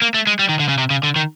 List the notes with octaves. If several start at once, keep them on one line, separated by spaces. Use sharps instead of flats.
A#3
A3
G#3
G3
D#3
D3
C#3
C3
C#3
D3
D#3